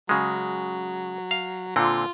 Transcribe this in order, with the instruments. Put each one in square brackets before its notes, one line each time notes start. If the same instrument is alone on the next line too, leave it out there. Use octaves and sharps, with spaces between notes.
[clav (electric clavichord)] C#3 G#3 [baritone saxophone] F#3
[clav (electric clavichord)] F5
[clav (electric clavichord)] A#2 D3 C4 [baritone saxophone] F4